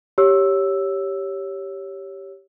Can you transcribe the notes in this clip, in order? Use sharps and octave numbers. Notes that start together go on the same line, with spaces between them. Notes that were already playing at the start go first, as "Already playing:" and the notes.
G4 C#5 E6